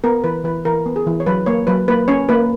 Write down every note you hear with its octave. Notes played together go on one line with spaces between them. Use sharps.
B3 A#4
E3 B4
E3 B4
E3 A#4
B3
G#4
E3
C#5
F#3 B4
A#3 C#5
F#3 B4
A#3 B4
C#4 C#5
A#3 B4